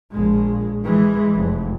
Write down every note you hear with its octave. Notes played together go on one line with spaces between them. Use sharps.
A#1 G#3
E3 G#3
F1